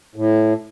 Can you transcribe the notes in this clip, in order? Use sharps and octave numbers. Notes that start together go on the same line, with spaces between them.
A2